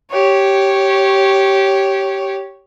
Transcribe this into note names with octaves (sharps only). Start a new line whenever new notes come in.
G4 C#5